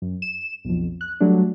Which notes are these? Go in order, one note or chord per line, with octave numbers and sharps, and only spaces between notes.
F#2
E7
B1 F2
F#6
F#3 G3 A3 D4